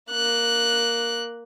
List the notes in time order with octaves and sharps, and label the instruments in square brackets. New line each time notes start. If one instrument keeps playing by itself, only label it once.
[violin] A#3 F#6